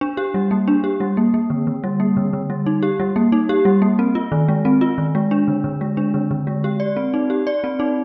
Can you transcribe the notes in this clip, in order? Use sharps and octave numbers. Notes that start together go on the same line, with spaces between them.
D4
G4
G3
A#3
D4
G4
G3
A#3
A#3
D3
D3
G3
A#3
D3
D3
G3
D#4
G4
G3
A#3
D#4
G4
G3
A#3
C4
F4
D#3
G#3
C4
F4
D#3
G#3
D4
D3
D3
G#3
D4
D3
D3
G#3
G4
D5
C4
D#4
G4
D5
C4
D#4